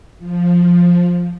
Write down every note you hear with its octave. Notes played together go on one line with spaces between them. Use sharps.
F3